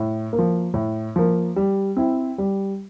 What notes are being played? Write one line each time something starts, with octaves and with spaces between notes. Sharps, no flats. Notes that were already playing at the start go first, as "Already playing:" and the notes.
Already playing: A2
A#3
F3
A2
F3 A#3
G3
C4 E4
G3